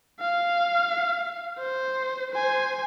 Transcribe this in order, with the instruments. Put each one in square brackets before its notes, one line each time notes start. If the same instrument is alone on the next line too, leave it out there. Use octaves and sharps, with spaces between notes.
[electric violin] F5
C5
C5 G#5